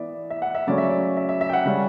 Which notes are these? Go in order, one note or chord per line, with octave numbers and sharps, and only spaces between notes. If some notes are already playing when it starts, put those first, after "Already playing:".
Already playing: E3 B3 D5 E5
E5
F#5
E5
C#3 F#3 A3 C#4 D5
E5
D5
E5
E5
E5
G5
F#5
C#3 G3 C#4